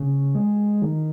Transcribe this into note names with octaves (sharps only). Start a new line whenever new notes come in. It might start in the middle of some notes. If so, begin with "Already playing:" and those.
Already playing: C#3
G#3
D#3